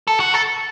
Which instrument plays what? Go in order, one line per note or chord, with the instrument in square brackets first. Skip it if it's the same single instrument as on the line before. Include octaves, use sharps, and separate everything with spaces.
[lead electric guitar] A4
F#4
A4